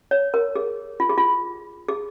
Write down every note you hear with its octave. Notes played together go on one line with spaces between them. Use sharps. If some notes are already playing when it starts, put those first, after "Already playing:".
C#5
A#4
G#4
F4
G#4
F4
G#4